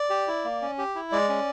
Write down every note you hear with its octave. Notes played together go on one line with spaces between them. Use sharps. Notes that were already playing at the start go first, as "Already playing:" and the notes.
Already playing: D5
G4
E4
A#3
C#4
G4
E4
G#3 D5
C#4